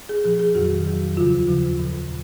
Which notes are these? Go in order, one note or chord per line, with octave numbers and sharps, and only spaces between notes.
G#4
A#2 F3 G#4
G#4
F2 D#3 F#3 F#4
F2 D#3 F#3
D#2 C#3 F3 F4
D#2 C#3 F3 F4
A#2 F3